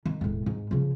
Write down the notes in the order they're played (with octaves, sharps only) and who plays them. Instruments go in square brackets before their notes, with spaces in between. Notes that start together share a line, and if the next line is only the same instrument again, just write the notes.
[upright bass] D#3
E1 A2
G#2
C#3 F3